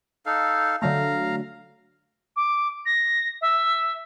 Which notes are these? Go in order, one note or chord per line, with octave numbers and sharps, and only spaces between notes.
D#4 A4 F5
D3 F#3 A3 F5 A#5
D6
A#6
E5